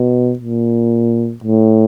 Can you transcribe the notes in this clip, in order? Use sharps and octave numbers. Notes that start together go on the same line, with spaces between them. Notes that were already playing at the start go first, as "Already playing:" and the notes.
Already playing: B2
A#2
A2